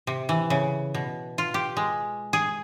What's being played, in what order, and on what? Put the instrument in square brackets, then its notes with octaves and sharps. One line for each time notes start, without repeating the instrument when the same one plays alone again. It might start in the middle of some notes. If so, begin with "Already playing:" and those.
[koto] C3
E3
C#3
B2
F4
G4
G#3
G#4